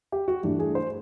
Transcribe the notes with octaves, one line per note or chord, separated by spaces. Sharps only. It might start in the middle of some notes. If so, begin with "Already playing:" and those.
G4
F#4
G2 E3 A3 D4 G4
G#4
C5